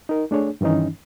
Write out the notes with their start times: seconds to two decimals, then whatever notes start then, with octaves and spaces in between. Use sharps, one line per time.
0.09 D#4 A#4
0.31 A3 D4 G#4 C#5
0.61 G2 D#3 E3 C#4 D#4